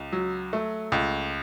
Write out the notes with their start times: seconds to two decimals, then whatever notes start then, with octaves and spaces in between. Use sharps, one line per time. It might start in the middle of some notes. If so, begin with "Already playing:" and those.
Already playing: C#2
0.12 F#3
0.53 A3
0.92 C#2